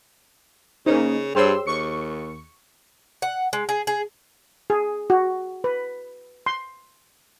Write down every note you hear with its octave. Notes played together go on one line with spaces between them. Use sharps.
C#3 A#3 C#4 D#4 C5
G2 G4 G#4 C5 C#5 C6 E6
D#2 C#6 C#7
F#5
G#3
G#4
G#4
G#4
F#4
B4
C6